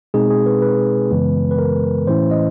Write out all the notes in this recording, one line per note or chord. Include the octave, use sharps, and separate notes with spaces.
B2 G#3 C4 D#4 G#4
G#4
B4
B4
F#2 C#3 E3 G#3 B3
B4
A#4
A2 E3 A3 C#4 E4 C5
D#5